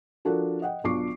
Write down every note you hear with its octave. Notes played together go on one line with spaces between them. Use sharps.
F3 D4 F#4 A4 A#4
D#5 F#5 G5
B1 D4 F4 C#6 D6 C7